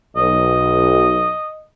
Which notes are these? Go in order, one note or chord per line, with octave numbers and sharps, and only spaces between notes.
B1 D#5